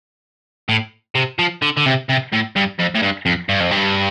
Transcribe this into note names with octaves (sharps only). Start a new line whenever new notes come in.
A2
C3
F3
D3
D3
C3
C3
A2
G2
F2
A2
G2
F2
G2
F2
G2